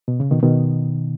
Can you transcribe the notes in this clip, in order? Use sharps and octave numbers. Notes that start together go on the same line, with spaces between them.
B2
C#3
B2 D#3
B2 D#3